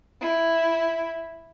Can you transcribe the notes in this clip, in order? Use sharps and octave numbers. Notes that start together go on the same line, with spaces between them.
E4